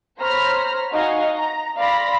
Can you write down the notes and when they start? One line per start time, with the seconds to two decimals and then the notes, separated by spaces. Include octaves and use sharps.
0.18 C5 C#5 A#5 B5 F6 A#6
0.92 D#4 F#4 D#5 F5 G#5 C#6
1.33 A#5
1.77 D5 F5 B5 C6 A#6